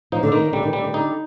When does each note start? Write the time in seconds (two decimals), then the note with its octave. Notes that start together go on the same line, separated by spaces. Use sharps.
0.12 F3 D#4
0.23 D3
0.32 D#3 A#3
0.52 D3 G3
0.63 D#3
0.73 D3 G3
0.84 D#3
0.93 D3 D#4